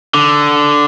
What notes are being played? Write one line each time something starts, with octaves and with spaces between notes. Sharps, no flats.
D3